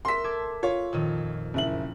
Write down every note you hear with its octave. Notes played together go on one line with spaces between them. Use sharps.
A#4 E5 C6 B6
A4 D6 G#6
F4 C#5
F2 A#2 D#3
F#1 E4 F#7